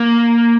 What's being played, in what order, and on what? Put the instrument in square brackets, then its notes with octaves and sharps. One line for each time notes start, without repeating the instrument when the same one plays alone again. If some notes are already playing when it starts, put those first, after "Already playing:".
Already playing: [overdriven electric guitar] A#3